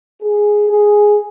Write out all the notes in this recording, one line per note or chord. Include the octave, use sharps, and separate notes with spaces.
G#4
G#4